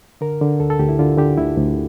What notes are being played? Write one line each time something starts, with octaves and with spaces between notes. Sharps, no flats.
D3 A#4
D3
D2 A4
A4
D2 G4
E4
D3 F4
D3 G4
D2 E4
D2